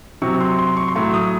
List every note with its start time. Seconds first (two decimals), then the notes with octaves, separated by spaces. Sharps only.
0.22 C3 F#3 C#6
0.41 C6
0.59 C6
0.77 C#6
0.88 C6
0.96 A2 F#3 C#6
1.14 D#6